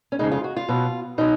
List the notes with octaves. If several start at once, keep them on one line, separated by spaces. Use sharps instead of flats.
C#4
F2 C#3 G#3 D#4
F4
F#4
F4
B2 F#3
B2 F#3 D#4